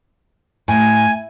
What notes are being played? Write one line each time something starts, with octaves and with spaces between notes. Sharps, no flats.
A2 G#5